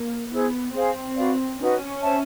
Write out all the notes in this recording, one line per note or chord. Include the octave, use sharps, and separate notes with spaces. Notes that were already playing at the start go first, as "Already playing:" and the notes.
Already playing: A#3
B3 E4 G#4 C5
C4 G#4 C5 F5 G#5
F#4 B4 D5 F5
C#4 D#4 F#4 B4
C5 E5 A5